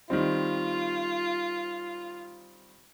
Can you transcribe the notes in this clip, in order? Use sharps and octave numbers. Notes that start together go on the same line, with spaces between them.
D#3 G3 C4 F4